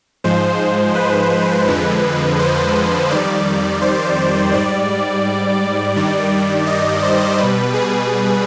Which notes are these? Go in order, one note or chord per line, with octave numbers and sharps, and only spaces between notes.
G#2 F3 G#3 C5
B4
F2 D3 F3 G#3
C5
F2 D#3 G3 D5
C5
G#2 G3 D5
G2 D#3 G3
D#5
C5
B2 G3 B4
G#4